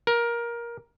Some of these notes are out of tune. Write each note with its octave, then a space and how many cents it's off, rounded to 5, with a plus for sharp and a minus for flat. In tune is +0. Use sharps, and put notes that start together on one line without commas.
A#4 +15